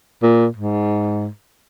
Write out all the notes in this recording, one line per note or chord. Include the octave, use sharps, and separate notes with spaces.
A#2
G#2